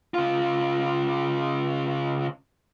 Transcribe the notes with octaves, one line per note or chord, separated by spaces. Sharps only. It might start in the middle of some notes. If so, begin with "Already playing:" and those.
C#3 F4